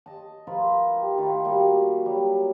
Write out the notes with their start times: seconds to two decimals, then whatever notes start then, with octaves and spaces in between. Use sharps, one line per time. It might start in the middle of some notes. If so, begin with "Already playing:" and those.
0.06 D#5 A5
0.47 F3 F4 A#4 B4
0.97 G4
1.18 D#3 A3 E4 F4
1.45 G3 A#3 F#4
2.06 F#3 G3